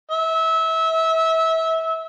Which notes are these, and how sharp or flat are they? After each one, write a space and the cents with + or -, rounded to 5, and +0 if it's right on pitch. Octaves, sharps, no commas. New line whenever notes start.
E5 -25